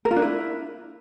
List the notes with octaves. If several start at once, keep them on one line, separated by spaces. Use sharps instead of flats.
A#4
F4
D4
E4